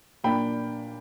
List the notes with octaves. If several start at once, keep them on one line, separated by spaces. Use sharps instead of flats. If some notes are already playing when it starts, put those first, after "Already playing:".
A#2 A#3 D4 G5 B5